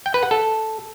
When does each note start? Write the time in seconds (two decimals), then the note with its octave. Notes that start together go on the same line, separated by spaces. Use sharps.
0.06 G5
0.14 B4
0.23 F#5
0.31 A4